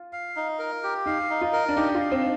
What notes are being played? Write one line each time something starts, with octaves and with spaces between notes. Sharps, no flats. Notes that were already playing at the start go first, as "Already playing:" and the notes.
Already playing: F4
F5
D#4
A#4
G4
D#4 F5
D#4
F4
A#4
D4
D#4 G4
F4
F5
C4